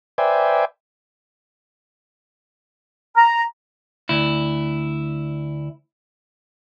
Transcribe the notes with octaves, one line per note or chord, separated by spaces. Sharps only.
B4 C5 D5 E5 G5 G#5
A#5
D2 E4